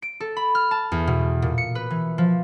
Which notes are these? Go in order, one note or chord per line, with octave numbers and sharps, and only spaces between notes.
D7
A4
B5
F6
A5
E2
B2
A#2
C#7
B4
E3
F3